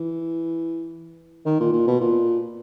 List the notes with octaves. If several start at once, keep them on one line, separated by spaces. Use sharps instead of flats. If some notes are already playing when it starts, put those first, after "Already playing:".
Already playing: E3
D#3
A#2
A#2
B2
A#2